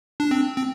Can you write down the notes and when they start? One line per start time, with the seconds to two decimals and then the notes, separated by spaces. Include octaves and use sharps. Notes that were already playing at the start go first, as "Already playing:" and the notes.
0.20 D4
0.31 C4
0.58 C4